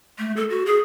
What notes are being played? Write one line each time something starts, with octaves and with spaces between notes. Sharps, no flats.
A3
A4
F#4
G#4